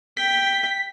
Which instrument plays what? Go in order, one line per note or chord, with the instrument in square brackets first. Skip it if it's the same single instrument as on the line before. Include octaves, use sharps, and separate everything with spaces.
[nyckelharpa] G5 [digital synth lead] B6